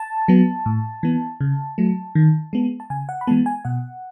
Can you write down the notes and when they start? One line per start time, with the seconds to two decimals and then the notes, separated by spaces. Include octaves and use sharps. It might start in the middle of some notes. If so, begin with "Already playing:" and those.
Already playing: A5
0.28 F#3 B3
0.66 A2
1.03 E3 B3
1.41 C#3
1.78 F#3 A3
2.15 D#3
2.53 G#3 B3
2.80 A5
2.90 C#3 G#5
3.09 F#5
3.21 B5
3.27 E3 G#3 B3 A5
3.46 G#5
3.65 B2 F#5